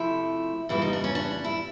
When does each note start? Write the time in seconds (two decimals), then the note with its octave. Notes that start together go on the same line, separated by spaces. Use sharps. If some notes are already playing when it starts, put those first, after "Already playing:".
Already playing: C3 F3 A3 E4
0.69 F2 C#3 E3 G3 B3 E4
0.82 D#4
0.93 D4
1.04 C#4
1.15 D4
1.44 E4